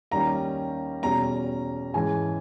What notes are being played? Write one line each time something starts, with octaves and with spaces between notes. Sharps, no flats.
D#2 D#3 G3 C#4 A#5
E2 B2 G3 C#4 A#5
G#2 E3 G#3 C#4 G#5